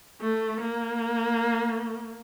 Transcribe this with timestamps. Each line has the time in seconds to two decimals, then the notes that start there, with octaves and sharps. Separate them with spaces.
0.21 A3
0.61 A#3